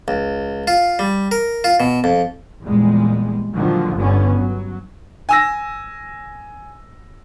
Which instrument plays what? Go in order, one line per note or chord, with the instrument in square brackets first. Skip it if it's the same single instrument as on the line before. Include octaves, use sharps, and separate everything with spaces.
[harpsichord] C#2
F4
G3
A#4
F4
B2
F2
[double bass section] E2 A#2 G3 G#3
A#2 D3 D#3 F3 F#3
G1 G2 D3 B3 C#4
F#3
[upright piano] G#5 E6 A#6